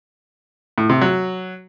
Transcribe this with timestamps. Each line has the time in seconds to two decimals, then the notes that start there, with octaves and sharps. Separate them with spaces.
0.78 A2
0.90 C3
1.01 F#3